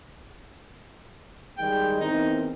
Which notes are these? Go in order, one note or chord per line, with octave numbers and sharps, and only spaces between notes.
D#3 G3 G#3 G5
E2 C4 D#4 A#4